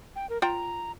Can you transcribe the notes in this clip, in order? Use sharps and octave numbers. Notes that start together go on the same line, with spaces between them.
G5
A#4
F4 C5 G5 A#5